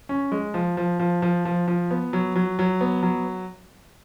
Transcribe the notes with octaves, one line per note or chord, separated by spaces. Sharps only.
C#4
G#3
F3
F3
F3
F3
F3
F3
B3
F#3
F#3
F#3
B3
F#3